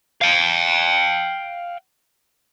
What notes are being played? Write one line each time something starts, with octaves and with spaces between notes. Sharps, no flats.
F5 G5